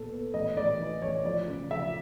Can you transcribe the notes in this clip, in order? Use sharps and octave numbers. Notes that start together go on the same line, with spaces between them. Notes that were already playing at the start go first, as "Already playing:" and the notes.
Already playing: A#2 B3 A4
B3
A1 D#5
A1 D5
E3
A1 C#5
F3 D5
C#3
F3 E5